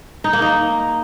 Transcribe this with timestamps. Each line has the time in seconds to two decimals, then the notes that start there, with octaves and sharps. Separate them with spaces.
0.24 D#4
0.33 A#3
0.42 D#4